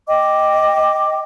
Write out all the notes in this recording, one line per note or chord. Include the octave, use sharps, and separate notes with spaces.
D#5 G5 D6